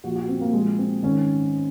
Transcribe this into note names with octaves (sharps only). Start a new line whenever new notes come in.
A#2 F3 F#4
F#4
C4
A#3
A#2 F3 G#3
C4
G#2 D#3 C#4